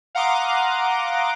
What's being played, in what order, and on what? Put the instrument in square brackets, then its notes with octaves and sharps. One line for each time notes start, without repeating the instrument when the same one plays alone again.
[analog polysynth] F5 F#5 A#5 C6 D6 D#6